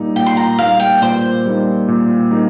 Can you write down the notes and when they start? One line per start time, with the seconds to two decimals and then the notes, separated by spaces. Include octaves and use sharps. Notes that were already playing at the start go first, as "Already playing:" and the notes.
Already playing: A#2 G3 A#3 D#4
0.16 A#2 G5
0.26 C6
0.37 A#5
0.58 G3 A#3 D#4 F5
0.80 G5
1.02 A#2 C5
1.46 G3 A#3 D#4
1.88 A#2
2.31 G3 A#3 D#4